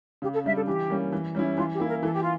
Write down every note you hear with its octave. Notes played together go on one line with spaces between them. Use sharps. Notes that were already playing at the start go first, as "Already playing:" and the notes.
C#3 G4
A4
G3 D4 E5
A4
E3 G4
G3 A#3 C#4
E3
G3 C#4 E4
E3 F4
G4
A#3 E4
A#4
E3 A4
G4
F4